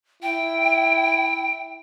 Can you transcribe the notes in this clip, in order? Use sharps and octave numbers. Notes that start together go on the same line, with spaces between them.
E4 G5